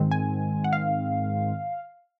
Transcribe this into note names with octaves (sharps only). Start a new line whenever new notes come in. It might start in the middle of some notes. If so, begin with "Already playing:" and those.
Already playing: G#2 D#3 G#3 C4
G#5
F#5
F5